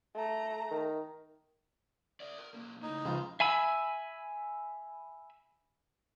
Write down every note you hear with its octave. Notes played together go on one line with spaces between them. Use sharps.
A3 A#5
D#3
D5 E5
A#4
B1 A#3
A2 C#3 D#4
C#2 F3 F4 A5 B5
E5 G#5 B5 E6